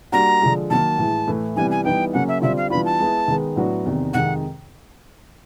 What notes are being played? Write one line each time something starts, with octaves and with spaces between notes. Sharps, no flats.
G3 A#3 D4 F#4 A#5
D3 F3 G#3
D#3 F#3 A#3 A5
A2 E3 G#3
A2 E3 A3
C3 E3 G3 B3 G#5
G#5
E3 G3 B3 D#4 G5
C#3 F#3 A#3 C#4 F#4 F#5
E5
D3 G3 C4 F4 E5
F5
E3 G3 B3 D4 F4 B5
A5
G#3 B3 E4
D#3 G#3 B3
A2 F#3 B3 D4 F#4
E2 C3 D#3
F2 C3 D#3 G#3 F#5